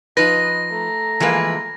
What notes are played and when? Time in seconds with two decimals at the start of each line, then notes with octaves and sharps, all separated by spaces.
0.17 F3 D#4 B4 D#5 A#6
0.71 A3 A#5
1.20 E3 F3 G#3 A#3 B4